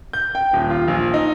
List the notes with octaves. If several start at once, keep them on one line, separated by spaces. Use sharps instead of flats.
G6
G5
D#1
F4
A#1
D#4